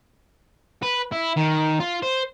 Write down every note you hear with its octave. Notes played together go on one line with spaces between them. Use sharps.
B4
E4
D#3
F4
C5